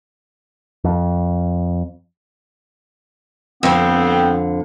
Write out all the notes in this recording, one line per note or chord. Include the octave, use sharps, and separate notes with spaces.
F2
F2 D3 B3 C4